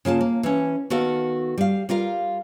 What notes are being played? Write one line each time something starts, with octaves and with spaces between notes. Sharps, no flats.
C#3 A#3 F4 A5
A#3
E3 C#4
D#3 B3 F#4 A4 F5
G3 F5
G3 F4 A#4 F5